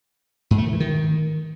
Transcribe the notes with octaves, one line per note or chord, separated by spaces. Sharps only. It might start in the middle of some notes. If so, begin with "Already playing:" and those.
G#2
A3
D#3
E3
D#3